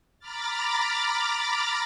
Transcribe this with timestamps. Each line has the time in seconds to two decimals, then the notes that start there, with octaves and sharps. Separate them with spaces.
0.19 A#5 B5 D6 F6 A6